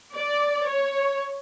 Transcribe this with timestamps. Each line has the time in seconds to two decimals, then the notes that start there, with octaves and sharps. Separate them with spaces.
0.15 D5
0.65 C#5